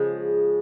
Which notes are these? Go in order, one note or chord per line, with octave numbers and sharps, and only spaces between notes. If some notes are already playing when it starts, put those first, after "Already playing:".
Already playing: C#3 F3 G#3